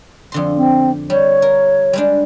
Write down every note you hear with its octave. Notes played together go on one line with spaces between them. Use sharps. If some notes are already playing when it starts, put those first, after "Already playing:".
F2 D3 C6
C4
G3 C#5
A#4
G3 G#3 D4